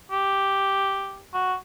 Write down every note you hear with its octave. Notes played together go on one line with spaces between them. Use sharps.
G4
F#4